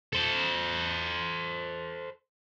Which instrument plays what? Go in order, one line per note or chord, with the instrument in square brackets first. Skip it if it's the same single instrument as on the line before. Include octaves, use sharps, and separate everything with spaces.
[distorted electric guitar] A4 C5